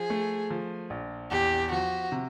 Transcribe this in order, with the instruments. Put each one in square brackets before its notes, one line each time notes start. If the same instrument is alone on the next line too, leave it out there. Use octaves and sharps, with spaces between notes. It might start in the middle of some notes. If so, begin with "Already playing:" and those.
Already playing: [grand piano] F3 [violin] G#4
[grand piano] A3
F3
A#1
[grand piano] E2 [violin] G4
[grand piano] F3 [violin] F#4
[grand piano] C3